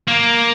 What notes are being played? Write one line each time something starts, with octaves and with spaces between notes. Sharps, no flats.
A#3